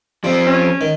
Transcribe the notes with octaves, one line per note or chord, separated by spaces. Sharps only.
F3 G3 C4
C#4
D#3